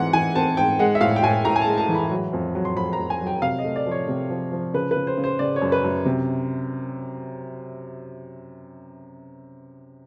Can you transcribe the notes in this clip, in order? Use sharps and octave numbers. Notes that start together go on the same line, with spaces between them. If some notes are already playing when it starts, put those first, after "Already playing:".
Already playing: G#2 E3 C4 F#5
E3 G#5
C4 A5
G#2 G5
G#3 F#5
E5
A2 F5
G5
A2 G#5
A2 A#5
G#5
A5
G#3
A5
E3
B5
F#3
F2
F#3
C6
F2 B5
A#5
F2
G#5
F#3
G5
C3 F5
D#5
A3
D5
F3 C#5
C3
F3
F3
C#3 B4
B4
C#3
C5
C#3
C5
C#3 D5
C#5
F#2
B4
F#2
C3